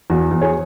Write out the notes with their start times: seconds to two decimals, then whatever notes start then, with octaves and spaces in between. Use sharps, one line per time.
0.10 E2 F#4
0.31 E2
0.41 G#4 C#5